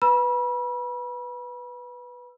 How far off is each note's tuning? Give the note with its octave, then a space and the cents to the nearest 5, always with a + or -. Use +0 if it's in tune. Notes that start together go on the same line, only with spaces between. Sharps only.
B4 +0 B5 -35 E6 +25